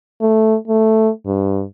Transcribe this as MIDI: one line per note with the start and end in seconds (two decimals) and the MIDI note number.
0.21 0.56 57
0.68 1.09 57
1.26 1.63 43